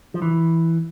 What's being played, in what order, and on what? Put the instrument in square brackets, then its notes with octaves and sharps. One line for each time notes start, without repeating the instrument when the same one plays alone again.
[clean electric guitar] F3
E3